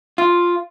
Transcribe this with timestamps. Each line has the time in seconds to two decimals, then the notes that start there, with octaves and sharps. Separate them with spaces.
0.18 F4